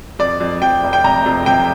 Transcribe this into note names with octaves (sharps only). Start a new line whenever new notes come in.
F2 D5
F2
F2 G5
F1
G5
C3 A#5
F2
C3 G5